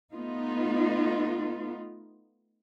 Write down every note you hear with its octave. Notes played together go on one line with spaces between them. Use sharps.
A3 B3 D#4 F4